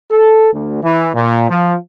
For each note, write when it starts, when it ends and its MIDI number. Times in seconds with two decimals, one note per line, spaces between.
0.11 0.48 69
0.53 0.79 38
0.83 1.09 52
1.15 1.48 46
1.50 1.75 53